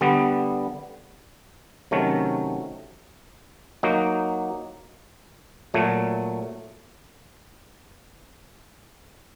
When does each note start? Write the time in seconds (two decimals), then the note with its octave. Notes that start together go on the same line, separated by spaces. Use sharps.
0.01 D3 G3 B3
1.91 C3 D#3 F#3 A3 C#4
3.83 F#3 A#3 D#4 F#4
5.74 A#2 F#3 A3